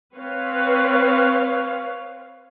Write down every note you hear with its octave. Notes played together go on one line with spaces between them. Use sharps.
C4 B4 C#5 F5